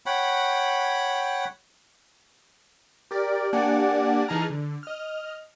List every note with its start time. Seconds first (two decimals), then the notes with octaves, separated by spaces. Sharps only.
0.06 C#5 F#5 G5 B5
3.11 G4 A#4 D5
3.53 A#3 D4 G4 D5 F#5 G#5
4.28 E3 D#4 G#4 A5 A#5 F6
4.50 D3
4.83 D#5 F6